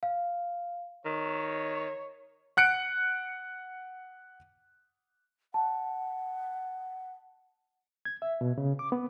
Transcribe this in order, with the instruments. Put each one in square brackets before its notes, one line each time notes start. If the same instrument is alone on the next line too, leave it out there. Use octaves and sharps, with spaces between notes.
[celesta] F5
[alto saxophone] D#3 [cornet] C#5
[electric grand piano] F#5 F#6 C#7 D7
[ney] F#5 [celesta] A5
[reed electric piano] G#6
E5
B2
C#3
D6
B3